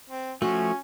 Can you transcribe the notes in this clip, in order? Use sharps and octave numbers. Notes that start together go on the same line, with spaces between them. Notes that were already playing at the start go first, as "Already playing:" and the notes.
C4
F3 A3 C#4 F#4 G#5